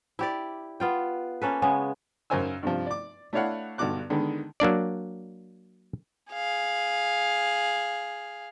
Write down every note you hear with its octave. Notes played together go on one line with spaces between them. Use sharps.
E4 G4 D5
B3 F4 G5
A#3 C#4 A4 B4
C#3 G#3 B3
F#2 C#3 A#4 C5 G#5 E6
G2 C3 F3
D5 D6
A3 D4 E4 C#5 F5 F#5
B1 G2 D3 F#4 D6 F#6
D3 D#3 G#3 B3
F#3 A#3 D4 D5
G#4 F5